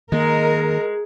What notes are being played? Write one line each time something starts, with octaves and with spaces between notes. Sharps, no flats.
D#3 G#3 A#3 A#4